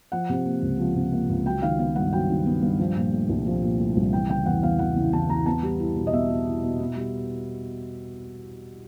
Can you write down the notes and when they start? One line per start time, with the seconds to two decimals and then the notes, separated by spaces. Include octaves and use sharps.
0.12 F3 F#5
0.29 C3
0.46 A#3
0.62 C#2
0.79 F3
0.96 C3
1.13 A#3
1.29 C#2
1.46 F#3 G5
1.62 D#3 F5
1.79 B3 F5
1.95 G2 F#5
2.13 F#3 G5
2.30 D#3
2.46 B3
2.62 G2
2.79 F3
2.96 A#2
3.13 A3
3.29 C2
3.46 F3
3.62 A#2
3.79 A3
3.96 C2
4.13 E3 G5
4.30 C#3 G5
4.46 E2 F#5
4.63 E2 F5
4.79 E3 F#5
4.96 C#3
5.13 E2 A5
5.29 E2 A#5
5.46 B3 A5
5.63 G3
5.80 E4
5.96 B2
6.07 D#5
6.13 B3 E5
6.30 G3
6.47 E4
6.63 B2
6.80 B3
6.96 G3